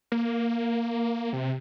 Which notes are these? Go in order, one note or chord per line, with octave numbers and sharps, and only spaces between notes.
A#3
C3